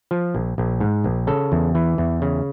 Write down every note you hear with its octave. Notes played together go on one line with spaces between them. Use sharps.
F3
A#1
A#1
G#2
A#1
C#3 A4
E2
E3
E2
C#3